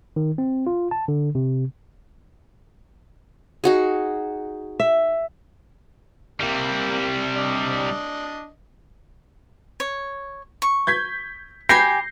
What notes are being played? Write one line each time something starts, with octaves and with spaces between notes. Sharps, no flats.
D#3
C4
F4
A5
D3
C3
D#4 F#4 G#4
E5
C3 G3 A#3
D4 D5 D#5
C#5
C#6
G6 G#6 B6
G4 G#5 B5 G6 A#6 C7